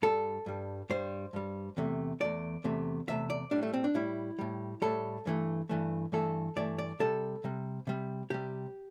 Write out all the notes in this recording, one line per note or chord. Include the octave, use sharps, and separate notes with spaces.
G2 G3 A4
G2 G3
G2 G3 C5
G2 G3
E2 C3 A3
E2 C3 A3 D5
E2 C3 A3
E2 C3 A3 E5
D5
A2 G3 D4
A3
C4
D4
A2 G3 E4
A2 G3
A2 G3 A4
G2 E3 A3
G2 E3 A3
G2 E3 A3 A4
G2 E3 A3 D5
D5
C3 G3 A4
C3 G3
C3 G3
C3 G3 G4